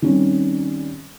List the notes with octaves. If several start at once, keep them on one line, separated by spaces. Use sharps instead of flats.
D#3 G3 C4 C#4